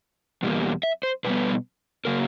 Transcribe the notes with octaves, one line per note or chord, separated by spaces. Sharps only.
E2 B2 G3 A#3
E5
C5
B2 G3 B3 B4
C#3 F#3 A#3 A#4